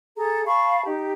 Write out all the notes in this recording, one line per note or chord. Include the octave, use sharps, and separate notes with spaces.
G#4 A4 A#5
F5 A5 B5 C#6
D#4 G4